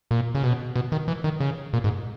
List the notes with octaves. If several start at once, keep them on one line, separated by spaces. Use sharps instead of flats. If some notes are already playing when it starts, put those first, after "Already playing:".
A#2
C#3
B2
B2
D#3
E3
D#3
C#3
A#2
G#2